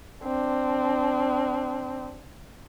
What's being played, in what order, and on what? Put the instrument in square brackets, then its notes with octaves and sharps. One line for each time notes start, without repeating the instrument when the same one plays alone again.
[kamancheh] C4 D4